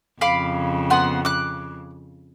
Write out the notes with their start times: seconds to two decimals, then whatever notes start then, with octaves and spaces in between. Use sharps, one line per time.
0.21 F2 C#3 F5 B5 D6
0.90 B3 F#5 C6
1.25 D6 F#6